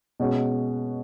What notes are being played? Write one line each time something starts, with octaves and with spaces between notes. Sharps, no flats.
B2 G#3 C#4 F#4